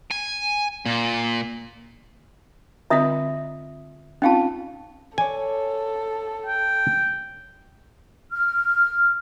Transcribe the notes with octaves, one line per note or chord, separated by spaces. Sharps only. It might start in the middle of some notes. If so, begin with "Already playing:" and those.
G#5
A#2
D3 C4 F4 D#5 E5 D#6
C4 C#4 D#4 F4 F5 A5
A4 C#5 D5 G#5
G5
F6